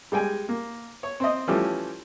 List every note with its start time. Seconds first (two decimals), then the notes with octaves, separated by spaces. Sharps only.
0.12 G3 G#3 G5 G#5
0.49 A#3
1.03 C#5
1.20 C4 D#5
1.47 E3 F3 G3 A3 C#4 G4